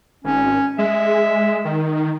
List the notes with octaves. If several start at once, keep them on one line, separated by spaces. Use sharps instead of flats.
G#1 C#4
G#3 E5
D#3